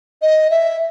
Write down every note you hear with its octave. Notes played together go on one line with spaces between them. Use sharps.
D#5
E5